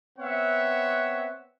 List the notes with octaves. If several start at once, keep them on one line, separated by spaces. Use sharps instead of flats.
B3 C4 C#5 E5 F#5